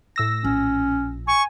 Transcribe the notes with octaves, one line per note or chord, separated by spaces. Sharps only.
A2 E6 A#6
A#1 C#4
G#5 C#6